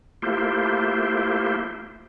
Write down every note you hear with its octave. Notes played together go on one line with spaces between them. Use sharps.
A3 A#3 E4 F4 G4 C5